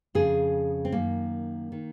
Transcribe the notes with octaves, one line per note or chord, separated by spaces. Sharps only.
F2 C#3 G#4
C4
F#2 D#3 A#3
D#3